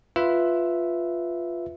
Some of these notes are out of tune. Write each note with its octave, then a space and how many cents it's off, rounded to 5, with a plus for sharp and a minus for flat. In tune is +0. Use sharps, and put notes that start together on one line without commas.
F4 +0 B4 +0 E5 +0